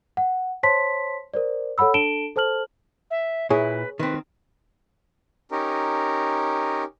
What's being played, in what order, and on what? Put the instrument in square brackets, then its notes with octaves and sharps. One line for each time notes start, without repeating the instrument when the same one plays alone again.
[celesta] F#5
C5 C#5 A5 C6 B6
A#4 C5 D5
A4 C#5 F#5 B5 E6
D4 A4 A5 D7 E7 G7
A4 C5 A5 F6 F#7
[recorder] E5
[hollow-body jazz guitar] A#2 E4 [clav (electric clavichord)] G#4 C#5 [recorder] B4
[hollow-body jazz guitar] D#3 C4 [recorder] B4
[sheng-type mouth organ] C#4 D#4 G4 A#4